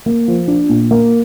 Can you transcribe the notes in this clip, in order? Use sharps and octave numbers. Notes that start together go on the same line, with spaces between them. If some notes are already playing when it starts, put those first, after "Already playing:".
A#3
F3
D4
A#2
A#3